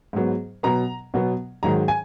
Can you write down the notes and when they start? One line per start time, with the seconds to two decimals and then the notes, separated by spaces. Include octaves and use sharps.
0.13 G#2 F#3 B3
0.63 B2 F#3 B3 A#5
1.14 B2 F#3 B3
1.63 G#2 D#3 F#3 A#5
1.88 G#5